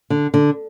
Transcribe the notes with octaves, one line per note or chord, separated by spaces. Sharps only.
D3
D3